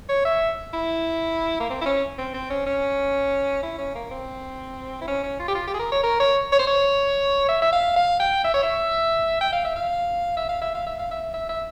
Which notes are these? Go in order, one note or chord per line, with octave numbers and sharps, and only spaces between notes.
C#5
E5
E4
A#3
C4
E4
C#4
C4
C4
C#4
C#4
E4
C#4
A#3
C4
E4
C#4
C#4
F4
G4
F4
G4
G#4
A#4
C#5
A#4
C#5
C#5
C5
C#5
E5
E5
F5
F5
G5
E5
C#5
E5
G5
F5
E5
F5
E5
F5
E5
F5
E5
F5
E5
E5
E5